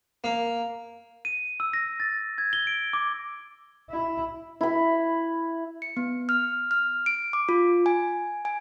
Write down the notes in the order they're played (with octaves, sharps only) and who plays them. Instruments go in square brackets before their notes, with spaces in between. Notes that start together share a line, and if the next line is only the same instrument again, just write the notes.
[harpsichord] A#3
[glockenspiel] D#7
E6
A#6
A6
G#6
G7
D7
D6
[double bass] E4
[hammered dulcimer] E4 B5
[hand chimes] C#7
B3
F6
F6
D7
D6
F4
G#5
G#5